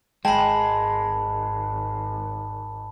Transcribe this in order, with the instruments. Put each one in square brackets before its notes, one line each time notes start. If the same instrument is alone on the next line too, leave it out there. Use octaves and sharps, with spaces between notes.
[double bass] G#1 [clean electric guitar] G#3 [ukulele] G5 [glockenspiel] A5 B5